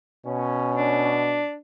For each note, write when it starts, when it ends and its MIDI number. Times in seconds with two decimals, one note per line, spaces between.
0.26 1.43 47
0.26 1.14 61
0.76 1.55 62